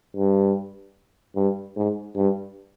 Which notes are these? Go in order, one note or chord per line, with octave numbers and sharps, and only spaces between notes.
G2
G2
G#2
G2